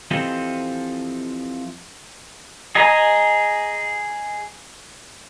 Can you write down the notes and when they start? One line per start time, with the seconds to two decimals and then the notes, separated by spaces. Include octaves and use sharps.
0.11 E3 F3 C4 G4 A4 D#5
2.75 G#4 D#5 G#5 A#5